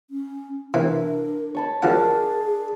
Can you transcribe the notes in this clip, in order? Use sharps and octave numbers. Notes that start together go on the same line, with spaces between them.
C#4
C3 E3 D4 A#4
C#5 A5 B5
D2 F3 D4 G#4 A#4 F#5